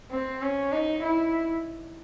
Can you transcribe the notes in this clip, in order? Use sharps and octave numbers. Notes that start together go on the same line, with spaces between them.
C4
C#4
D#4
E4